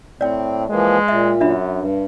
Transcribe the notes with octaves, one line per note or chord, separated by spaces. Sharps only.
A2 C4 D5 G5
E3 F3 G#3 A#3
A#2 E5
F#2 D4 E5 B5
G2